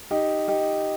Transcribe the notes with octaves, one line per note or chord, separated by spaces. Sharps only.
D#4 G4
D#4 G4